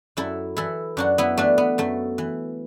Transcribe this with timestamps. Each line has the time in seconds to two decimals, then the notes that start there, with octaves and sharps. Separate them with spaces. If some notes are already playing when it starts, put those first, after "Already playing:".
0.17 F#2 E4 A4
0.57 E3 E4 A4
0.97 F#2 D4 F#4
1.18 B3 E4
1.38 E3 A3 D4
1.58 B3
1.78 F#2 A3
2.18 E3